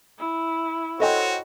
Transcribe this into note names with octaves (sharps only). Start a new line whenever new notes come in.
E4
F#4 A4 C5 C#5 D#5 G5